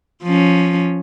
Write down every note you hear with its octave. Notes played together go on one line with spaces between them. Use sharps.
F3 C#4